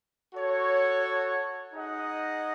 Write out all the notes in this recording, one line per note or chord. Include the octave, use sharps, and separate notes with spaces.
F#4 A4 C#5
D#4 G#4 D#5 F#5